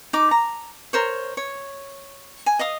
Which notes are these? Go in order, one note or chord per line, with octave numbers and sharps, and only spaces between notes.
D#4 D6
A#5
A#4 C5 C#5
C#5
G#5
D#5 F5 D#6